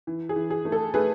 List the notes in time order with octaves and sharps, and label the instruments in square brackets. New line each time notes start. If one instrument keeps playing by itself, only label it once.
[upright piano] E3
G#4
E3
G#4
A3
A4
A3 G#4 B4